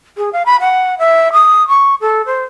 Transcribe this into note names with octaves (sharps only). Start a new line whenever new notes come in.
G#4
F5
B5
F#5
E5
D#6
C#6
A4
C5